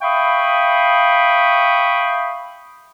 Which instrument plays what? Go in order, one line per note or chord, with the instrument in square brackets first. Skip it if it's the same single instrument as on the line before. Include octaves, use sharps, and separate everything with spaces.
[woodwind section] E5 F5 G5 B5 C#6 D#6